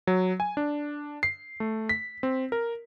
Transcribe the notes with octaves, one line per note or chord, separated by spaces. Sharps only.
F#3
G#5
D4
C7
A3
B6
C4
A#4